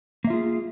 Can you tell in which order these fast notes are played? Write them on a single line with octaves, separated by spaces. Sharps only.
A#3 E5 F4 G#4